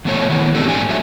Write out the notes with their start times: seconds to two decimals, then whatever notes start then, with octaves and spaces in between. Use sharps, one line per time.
0.05 E2 B2 A3 C#5
0.29 D#3 E3 G#3 B3
0.55 A3 C4 D4 G4 A4
0.68 G#2 D4 G#5
0.89 F#3 A4 E5